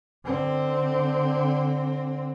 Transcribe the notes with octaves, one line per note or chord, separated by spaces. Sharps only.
D3 C4